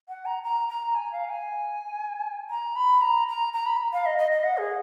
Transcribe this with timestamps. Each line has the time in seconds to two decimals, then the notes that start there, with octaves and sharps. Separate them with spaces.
0.09 F#5
0.26 A#5
0.43 A#5
0.69 A#5
0.95 G#5
1.12 F5
1.29 G#5
2.50 A#5
2.76 B5
3.02 A#5
3.28 A#5
3.53 A#5
3.66 B5
3.93 F5
4.06 D#5
4.18 D#5
4.32 D#5
4.44 F#5
4.57 G#4